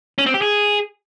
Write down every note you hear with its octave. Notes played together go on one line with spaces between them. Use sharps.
C#4
C4
G4
G#4